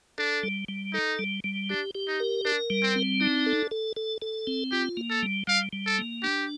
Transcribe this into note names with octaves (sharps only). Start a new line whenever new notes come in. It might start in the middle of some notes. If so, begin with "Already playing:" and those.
D4 A4
G3
G3
D#4 A4
G3
G3
D4 G4
G4
D#4
A#4
D4 A#4
G3
C4
C4
D4 D#4
A4
A4
A4
A4
C4
F4 G4
A#3
A4
G3
G3 F5
G3
A4
A#3
D4 G4